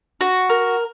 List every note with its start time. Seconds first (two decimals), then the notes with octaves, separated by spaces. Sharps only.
0.21 F#4
0.50 A#4